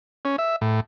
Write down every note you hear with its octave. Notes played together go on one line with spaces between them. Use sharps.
C#4
E5
A2